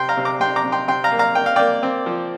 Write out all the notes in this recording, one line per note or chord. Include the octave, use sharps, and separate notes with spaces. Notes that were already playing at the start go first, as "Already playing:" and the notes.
Already playing: C3 G5 C6
F5 A#5
C3
A#5 D6
C3 G5 C6
A#5 D6
C3
G5 C6
C3 G5 C6
F5 A#5
A#3
F5 A#5
A#3 G5
F5
A#3 D5 G5
C4
F3